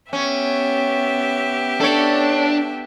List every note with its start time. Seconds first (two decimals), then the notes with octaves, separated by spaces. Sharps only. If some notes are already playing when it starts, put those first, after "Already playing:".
0.13 B3 C#4 G4 E5
1.80 D4 A4 C#5